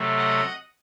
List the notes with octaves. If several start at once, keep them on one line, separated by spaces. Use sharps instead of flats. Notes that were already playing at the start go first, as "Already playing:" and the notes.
Already playing: C3 F#3 A3
D#5 F#5